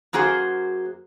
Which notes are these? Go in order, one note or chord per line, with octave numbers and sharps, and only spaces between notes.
F#2 A#3 F#4 G#4 C5